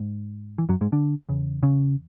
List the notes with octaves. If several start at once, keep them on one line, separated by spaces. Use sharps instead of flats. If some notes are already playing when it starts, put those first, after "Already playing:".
Already playing: G#2
E3
F#2 F#3
G#2 G#3
D3 D4
E2 C#3
C#3 C#4